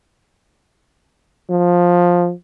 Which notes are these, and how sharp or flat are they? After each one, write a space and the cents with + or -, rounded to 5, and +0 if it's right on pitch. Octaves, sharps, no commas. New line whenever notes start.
F3 +10